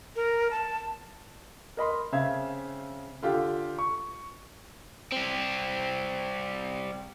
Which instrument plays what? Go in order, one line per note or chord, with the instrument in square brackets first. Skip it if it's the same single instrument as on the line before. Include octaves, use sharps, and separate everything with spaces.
[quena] A#4
A5
[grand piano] A#4 D#5 B5 C6
C#3 C4 E5 F5 G#6
D3 F4 G4
C#6
[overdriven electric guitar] G3 C4